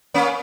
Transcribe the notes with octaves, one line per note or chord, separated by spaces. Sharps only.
A#3 C#4